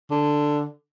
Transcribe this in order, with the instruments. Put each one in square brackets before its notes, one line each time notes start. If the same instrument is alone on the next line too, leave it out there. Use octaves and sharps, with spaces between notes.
[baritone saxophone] D3